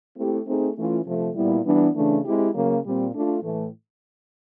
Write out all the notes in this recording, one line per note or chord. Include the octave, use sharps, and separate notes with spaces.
A3 C4 E4 G4
A3 C4 D#4 G#4
E3 A3 C#4 F4
C3 F3 A3
A#2 G3 B3 E4
E3 G3 B3 D4
C#3 E3 A3 D4
G#3 C4 E4 G4
C#3 F#3 A#3
A#2 G3 C4
A3 D4 F4
A2 E3 A3